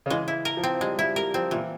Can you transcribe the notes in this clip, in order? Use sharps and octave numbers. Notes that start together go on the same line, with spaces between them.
C#3
E3 G#3
E4
A#4
F3
C4
G3 G#3
G3 E4
G3 A#4
F3 C4
A#2 E3